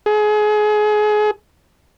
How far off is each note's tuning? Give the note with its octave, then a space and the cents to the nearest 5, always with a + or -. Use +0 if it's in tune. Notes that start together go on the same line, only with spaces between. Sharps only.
G#4 +30